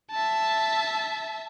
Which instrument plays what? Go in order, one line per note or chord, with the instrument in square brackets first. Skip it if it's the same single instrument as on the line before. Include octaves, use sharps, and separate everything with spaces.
[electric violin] E5 A5